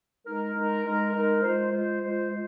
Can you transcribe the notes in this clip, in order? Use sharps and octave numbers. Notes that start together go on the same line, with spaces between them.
G#3 D#4 A#4
G#3 D#4 A#4
G#3 D#4 A#4
G#3 D#4 A#4
G#3 F4 C5
G#3 F4 C5
G#3 F4 C5
G#3 F4 C5